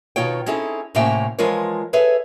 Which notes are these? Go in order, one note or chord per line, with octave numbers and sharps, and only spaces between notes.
B2 D#3 D#4 F4 C#5 G5
C4 C#4 D#4 E4 G#4 A4
A2 C3 A#3 C#4 E5 G5
E3 F3 G#3 F4 A#4 C#5
G#4 A4 B4 C#5 E5